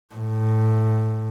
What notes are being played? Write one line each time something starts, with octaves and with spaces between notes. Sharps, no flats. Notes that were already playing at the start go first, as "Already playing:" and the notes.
A2